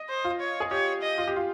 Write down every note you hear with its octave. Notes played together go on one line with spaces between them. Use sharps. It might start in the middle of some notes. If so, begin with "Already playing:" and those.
Already playing: D#5
C5
F4
C#5
G#4
G4 C#5
D#5
F4
G4
F4